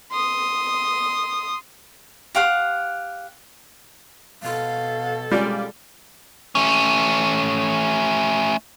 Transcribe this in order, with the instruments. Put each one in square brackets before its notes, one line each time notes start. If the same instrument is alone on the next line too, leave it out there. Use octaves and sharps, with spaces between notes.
[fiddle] C6 D#6
[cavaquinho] G4 F5 F#5 C6
[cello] B2 A4 [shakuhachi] F5
[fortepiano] G3 [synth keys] G#3 F4 D5 [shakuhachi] C#4
[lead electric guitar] A3 C#4